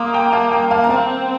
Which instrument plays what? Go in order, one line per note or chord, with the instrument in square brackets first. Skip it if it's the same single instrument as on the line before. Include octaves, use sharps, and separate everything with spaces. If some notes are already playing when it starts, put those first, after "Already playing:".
Already playing: [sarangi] A#3 [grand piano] A#5 C6 D6 D#6
[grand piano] G5 A#5
F5 A5
G5 A#5
F5 A5
A#5
[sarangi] C4 [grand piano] F5 A5